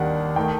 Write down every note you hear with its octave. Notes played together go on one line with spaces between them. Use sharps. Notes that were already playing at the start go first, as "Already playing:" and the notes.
Already playing: D#2 D#3 G3 D4 F#5
D#3 A3 G5